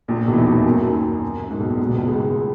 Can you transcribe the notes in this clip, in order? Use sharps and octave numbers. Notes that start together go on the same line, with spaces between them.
A#1 A#2
B1 B2
E3
D#2 D#3
E2 E3
F#2 F#3
D#2 D#3
F#2
F#2
G#2
B1 B2
A#1 A#2
B1 B2
C#2 C#3
G#2 G#3